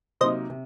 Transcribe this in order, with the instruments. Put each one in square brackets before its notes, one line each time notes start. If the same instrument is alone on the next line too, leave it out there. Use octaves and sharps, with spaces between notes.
[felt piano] C3 F#3 A#3 D#4 [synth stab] C5 D#5
[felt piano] C3